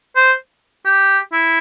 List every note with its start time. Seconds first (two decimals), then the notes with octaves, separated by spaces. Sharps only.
0.16 C5
0.86 G4
1.32 E4